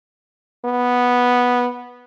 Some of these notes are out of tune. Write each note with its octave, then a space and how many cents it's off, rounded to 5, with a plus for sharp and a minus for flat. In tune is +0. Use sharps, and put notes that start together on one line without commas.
B3 -5